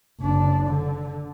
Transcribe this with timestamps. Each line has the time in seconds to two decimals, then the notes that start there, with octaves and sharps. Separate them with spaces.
0.21 F#1 D4
0.68 D3